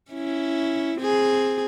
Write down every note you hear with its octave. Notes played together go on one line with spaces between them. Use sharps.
C#4 E4
C4 G#4